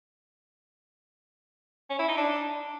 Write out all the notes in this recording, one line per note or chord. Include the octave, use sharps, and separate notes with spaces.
C#4
E4
D#4
D4